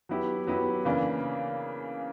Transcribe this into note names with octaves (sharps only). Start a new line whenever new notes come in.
F#3 B3 E4 G4
F#3 B3 E4 G4
C#3 E3 A#3 D4